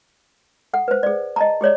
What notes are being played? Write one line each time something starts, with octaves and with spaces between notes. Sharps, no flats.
A4 F#5
B4 C5
G#4 D5
D#5 A5 A#5
G4 G#4 C#5 D5